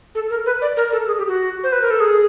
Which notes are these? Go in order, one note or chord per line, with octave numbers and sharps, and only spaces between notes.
A4
A#4
B4
D5
A#4
A4
G#4
G4
F#4
C5
B4
A#4
A4
G#4